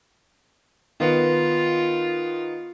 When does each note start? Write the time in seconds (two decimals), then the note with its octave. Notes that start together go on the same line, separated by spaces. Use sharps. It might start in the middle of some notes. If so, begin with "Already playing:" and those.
1.00 D#3 B3 F4